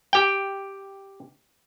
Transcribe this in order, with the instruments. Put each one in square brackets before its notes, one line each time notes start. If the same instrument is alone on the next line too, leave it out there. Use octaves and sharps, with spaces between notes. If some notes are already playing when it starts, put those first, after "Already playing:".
[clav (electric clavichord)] G4 G5